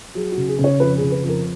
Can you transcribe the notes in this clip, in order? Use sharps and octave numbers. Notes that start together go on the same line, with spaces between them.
F#3 G#4
C#3 F#4
G#4
C#3
C#5
F2 B4
C#3 G#4
B4
F2
A#4